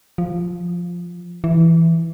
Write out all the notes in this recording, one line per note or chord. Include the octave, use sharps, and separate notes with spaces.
F3
E3